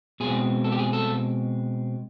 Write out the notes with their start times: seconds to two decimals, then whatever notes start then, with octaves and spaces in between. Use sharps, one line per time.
0.20 B2 G#3 C4 G#4
0.64 A4
0.72 G4
0.79 G#4
0.93 A4